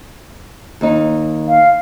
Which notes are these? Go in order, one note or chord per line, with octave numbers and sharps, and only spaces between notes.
D#2 D#4
F5